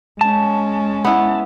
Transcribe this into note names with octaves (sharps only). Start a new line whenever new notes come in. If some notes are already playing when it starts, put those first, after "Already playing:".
G#3 C#4 A5
B3 E4